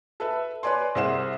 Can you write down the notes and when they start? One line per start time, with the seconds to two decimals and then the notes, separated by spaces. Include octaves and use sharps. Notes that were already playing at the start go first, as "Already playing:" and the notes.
0.20 A4 B4 E5
0.63 B4 C#5 D5 G#5 C6
0.95 C2 G#4 C5 F#5 E7